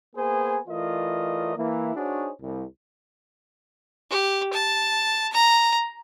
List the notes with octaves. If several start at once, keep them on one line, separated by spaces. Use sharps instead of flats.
A#3 B3 G#4 C5 G#5
E3 A3 F4 A#4 D5 D#5
E3 A#3 E4
D4 D#4 F#4 G#4 C5 C#5
C2
G4
A5
A#5